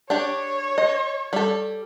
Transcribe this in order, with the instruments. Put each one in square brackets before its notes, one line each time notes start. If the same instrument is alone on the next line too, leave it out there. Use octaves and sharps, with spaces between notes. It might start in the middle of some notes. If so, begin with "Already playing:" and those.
[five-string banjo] D4 G4 [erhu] C#5
[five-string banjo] D#5
G3 A4